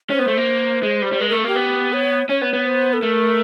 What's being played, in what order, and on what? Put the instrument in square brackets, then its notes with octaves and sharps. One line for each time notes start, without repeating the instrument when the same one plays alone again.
[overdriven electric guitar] C#4 [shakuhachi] C5
[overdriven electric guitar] B3
A3
A#3
G#3
G3
G3
[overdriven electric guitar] G#3 [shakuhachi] B4
[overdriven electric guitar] A3 [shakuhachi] A#4
[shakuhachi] A4
[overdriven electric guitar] A#3 [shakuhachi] G4
[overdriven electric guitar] B3
[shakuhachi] C#5
[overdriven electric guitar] C#4 [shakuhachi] C#5
[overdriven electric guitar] B3
B3
[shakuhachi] C5
A4
[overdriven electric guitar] A3 [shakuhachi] A#4